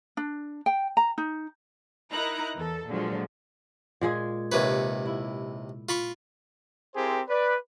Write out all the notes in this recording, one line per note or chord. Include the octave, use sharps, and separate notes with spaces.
D4
G5
A#5
D#4
D#4 E4 A#4 A#5 F#6
E2 A4
A#2 D3 F3 F#3 G#3
A#2 G#3 G#4
D#2 C3 B4 C#5 E5
E4
F4 B5 C#6
C4 E4 G4 G#4 A#4 C5
B4 D5